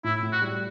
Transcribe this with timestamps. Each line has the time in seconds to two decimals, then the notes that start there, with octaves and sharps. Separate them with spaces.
0.04 A2 E4
0.23 A2
0.32 F#4
0.42 G3